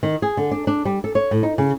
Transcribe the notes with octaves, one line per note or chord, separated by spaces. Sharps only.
D#3
G#4
D3
D4
D4
G3
A4
C#5
A2
D#4
C#3